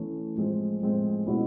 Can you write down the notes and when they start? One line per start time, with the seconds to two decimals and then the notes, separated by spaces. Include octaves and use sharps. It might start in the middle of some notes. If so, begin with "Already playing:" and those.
Already playing: E3 A3 C#4
0.35 A2 F3 G#3 C4
0.81 A2 F3 G#3 C4
1.27 B2 G#3 C#4 E4